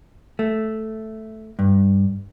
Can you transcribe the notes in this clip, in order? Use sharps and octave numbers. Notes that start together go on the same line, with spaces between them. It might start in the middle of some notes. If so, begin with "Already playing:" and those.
A3
G2